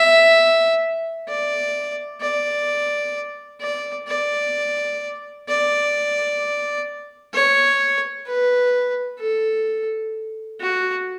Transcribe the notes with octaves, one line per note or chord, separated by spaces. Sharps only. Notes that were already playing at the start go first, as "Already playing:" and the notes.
Already playing: E5
D5
D5
D5
D5
D5
C#5
B4
A4
F#4